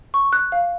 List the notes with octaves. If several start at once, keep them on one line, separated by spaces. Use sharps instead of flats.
C#6
F#6
F5